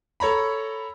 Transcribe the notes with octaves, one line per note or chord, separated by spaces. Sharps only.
A4 C#5 A#5 B5